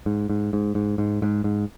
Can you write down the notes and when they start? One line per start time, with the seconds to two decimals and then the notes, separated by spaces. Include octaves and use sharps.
0.06 G#2
0.30 G#2
0.53 G#2
0.75 G#2
0.98 G#2
1.22 G#2
1.44 G#2